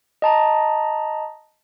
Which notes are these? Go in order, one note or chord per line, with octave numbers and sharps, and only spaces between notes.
D#5 A5 A#5